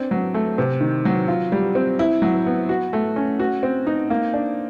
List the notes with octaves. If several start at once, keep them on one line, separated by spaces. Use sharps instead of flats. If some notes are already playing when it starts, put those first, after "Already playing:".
Already playing: C4 D4
F#3
A3
C3
D#3
F#3
F4
G3
C4
E4
F#3
B3
F#4
A3
C#4
F#4
C4
D#4
A#3
D4